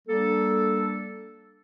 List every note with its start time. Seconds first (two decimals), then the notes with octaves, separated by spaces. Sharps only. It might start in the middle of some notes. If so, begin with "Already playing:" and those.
0.08 G3 A#3 D4 A4